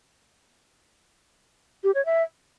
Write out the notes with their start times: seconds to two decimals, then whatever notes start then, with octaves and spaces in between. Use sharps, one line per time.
1.84 G4
1.94 C#5
2.05 E5